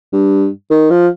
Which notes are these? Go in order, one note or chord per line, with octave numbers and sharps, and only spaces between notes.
G2
D#3
F3